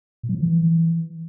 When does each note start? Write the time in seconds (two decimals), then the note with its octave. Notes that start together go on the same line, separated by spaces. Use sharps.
0.23 A#2
0.29 F#3
0.35 F3
0.40 D#3
0.46 E3